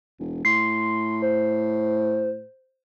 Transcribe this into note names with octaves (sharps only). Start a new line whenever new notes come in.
E1
A2 C6 C7
C5